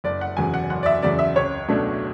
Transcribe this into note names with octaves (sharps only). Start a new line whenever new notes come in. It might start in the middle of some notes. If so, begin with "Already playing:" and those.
F#1 D5
F#5
E2 C#3 F#3 G#5
F#5
F#1 F#5
D5
E5
E2 C#3 F#3 D5
E5
C#2 C#5
B2 F#3 A3 D4